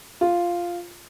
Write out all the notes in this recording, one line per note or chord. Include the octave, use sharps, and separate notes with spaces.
F4